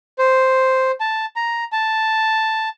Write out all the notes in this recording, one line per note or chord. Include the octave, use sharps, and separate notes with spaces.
C5
A5
A#5
A5